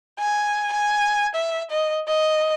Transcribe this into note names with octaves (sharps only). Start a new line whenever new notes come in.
G#5
G#5
E5
D#5
D#5